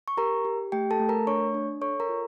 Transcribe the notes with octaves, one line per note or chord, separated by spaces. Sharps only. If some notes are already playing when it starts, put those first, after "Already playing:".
C#6
G4 A#4 A#5
G4
A3 G4 G5
A4 A5
A3
A#4 A#5
D4 C#5 C#6
D4
A4 C#5 C#6
A#4 A#5
F4